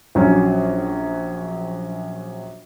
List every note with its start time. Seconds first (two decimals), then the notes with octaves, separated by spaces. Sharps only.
0.15 A#1 F#3 C#4